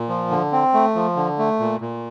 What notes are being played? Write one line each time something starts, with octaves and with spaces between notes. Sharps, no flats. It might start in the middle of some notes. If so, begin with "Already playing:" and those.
Already playing: A#2
F3
D3
C4
A3
F3
D3
A3
A#2
A#2